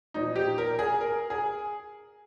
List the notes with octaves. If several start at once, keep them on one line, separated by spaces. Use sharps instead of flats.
A#2 F3 D#4
G4
A#4
G#4
A#4
G#4